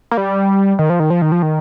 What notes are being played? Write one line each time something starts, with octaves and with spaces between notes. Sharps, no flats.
A#3
G3
D#3
F3
D#3
F3
D#3
F3
D#3